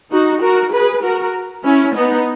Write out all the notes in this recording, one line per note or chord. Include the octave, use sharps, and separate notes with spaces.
D#4 F#4
F#4 A#4
G#4 B4
F#4 A#4
C#4 E4
B3 D#4